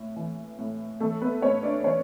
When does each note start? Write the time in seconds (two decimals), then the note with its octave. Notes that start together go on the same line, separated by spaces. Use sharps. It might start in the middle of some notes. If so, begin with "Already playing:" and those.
Already playing: A2
0.16 E3
0.59 A2
1.00 E3 A3 A4
1.21 B3 B4
1.42 A2 C#4 C#5
1.63 D4 D5
1.84 E3 C#4 C#5